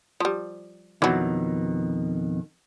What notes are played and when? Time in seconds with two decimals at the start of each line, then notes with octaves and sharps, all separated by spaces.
0.20 F3 G3
1.02 F2 B2 D#3 E3 F#3